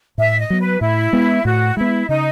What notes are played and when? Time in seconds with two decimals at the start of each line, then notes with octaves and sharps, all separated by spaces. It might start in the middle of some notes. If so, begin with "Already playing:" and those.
0.18 A2 E5
0.39 D#5
0.50 F#3 B3
0.60 B4
0.81 A2 E4
1.13 G#3 B3
1.45 A2 F#4
1.77 G#3 B3 E4
2.09 C#3 D#4